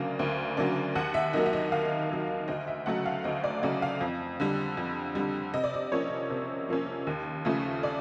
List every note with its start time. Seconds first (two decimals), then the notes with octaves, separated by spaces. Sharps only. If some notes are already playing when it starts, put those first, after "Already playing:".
Already playing: D2 C#3 F#3 A#3 D4 F5
0.19 D2
0.57 C#3 F#3 A#3 D4
0.95 D#2 F#5
1.14 E5
1.33 D#3 F#3 A#3 D#5
1.46 E5
1.53 D#5
1.72 D#2 F5
2.10 D#3 F#3 A#3
2.48 D2 D#5
2.68 E5
2.86 C#3 F#3 A3 F#5
3.06 F5
3.24 D2 D#5
3.44 D5
3.63 C#3 F#3 A3 D5
3.82 F5
4.01 F2
4.40 D3 G3
4.77 F2
5.15 D3 G3
5.54 C3 D#5
5.64 D5
5.74 D#5
5.92 F3 A#3 C#4 C#5
6.30 C3
6.69 F3 A#3 C#4
7.07 D#2
7.45 C#3 F3 A3 C#4
7.83 D5